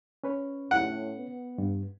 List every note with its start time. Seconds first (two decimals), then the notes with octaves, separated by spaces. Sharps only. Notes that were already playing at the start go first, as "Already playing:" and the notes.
0.24 C#4 B4 C#5
0.71 A2 F#5
1.17 B3
1.58 G2